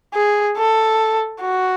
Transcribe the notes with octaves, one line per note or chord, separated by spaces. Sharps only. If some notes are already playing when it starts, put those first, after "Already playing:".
G#4
A4
F#4